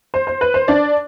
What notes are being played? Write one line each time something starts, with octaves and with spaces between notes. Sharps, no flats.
C5
C5
B4
C5
D4 D5